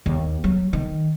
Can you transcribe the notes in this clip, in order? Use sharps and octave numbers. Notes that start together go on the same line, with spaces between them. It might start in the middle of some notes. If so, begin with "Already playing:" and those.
D#2
F#3
D#3